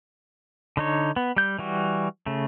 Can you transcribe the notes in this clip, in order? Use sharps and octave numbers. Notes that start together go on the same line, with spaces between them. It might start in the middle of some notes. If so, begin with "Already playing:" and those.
D3 D#4 C#5
B3
G3 G6
E3 G3 F#4
C#3 A3